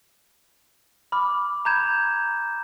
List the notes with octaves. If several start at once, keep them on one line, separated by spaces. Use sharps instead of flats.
B5 D6 F6
A#5 B5 G6 G#6 E7